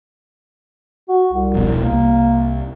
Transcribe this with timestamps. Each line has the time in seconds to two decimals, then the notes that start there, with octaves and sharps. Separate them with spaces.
1.09 F#4
1.33 C2
1.54 E1 A#1 B2
1.83 C2 A#3